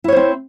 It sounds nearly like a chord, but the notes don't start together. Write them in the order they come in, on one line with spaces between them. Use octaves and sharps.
E4 C#5 C5 C4